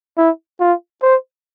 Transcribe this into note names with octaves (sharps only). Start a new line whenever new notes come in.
E4
F4
C5